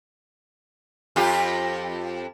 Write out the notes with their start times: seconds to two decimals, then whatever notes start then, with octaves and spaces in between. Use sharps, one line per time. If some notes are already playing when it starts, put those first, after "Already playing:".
1.16 F2 F4 G4